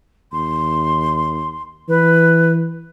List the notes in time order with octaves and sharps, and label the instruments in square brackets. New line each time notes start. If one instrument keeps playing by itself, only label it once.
[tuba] D#2 [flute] C6
[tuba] E3 [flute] B4